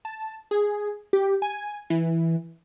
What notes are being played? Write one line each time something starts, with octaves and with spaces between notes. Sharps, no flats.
A5
G#4
G4
G#5
E3